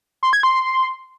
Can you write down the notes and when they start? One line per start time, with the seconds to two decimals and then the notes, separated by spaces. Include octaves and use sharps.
0.23 C6
0.33 G#6
0.43 C6